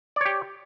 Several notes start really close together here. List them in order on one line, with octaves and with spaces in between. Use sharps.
D5 C#5 G4